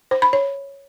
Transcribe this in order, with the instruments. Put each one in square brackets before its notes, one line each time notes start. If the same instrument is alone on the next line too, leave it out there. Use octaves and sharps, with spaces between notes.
[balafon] C5
B5
C#5